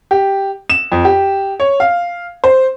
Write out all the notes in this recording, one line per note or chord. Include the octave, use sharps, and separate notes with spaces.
G4
E7
F2
G4
C#5
F5
C5